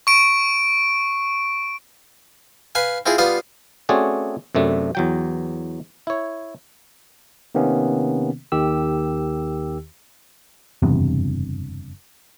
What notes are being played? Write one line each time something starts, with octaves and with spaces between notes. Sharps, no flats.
C#6 D7
B4 F5 G#5
C4 E4 F4 G#4
G3 B3 F4 F5 D#6
A3 C4 C#4 F#4 G#4 D5
F#2 C3 A3 D4
E2 F#3 G5
E4 C#5
C3 D#3 A#3 B3 C#4
D#2 D#3 G4 E6
F#1 E2 G2 C3